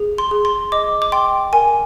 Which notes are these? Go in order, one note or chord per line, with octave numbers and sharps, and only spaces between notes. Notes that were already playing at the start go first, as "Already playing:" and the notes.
Already playing: G#4
C6
G#4
C6
D#5 D6
D6
G5 C6
A#4 G#5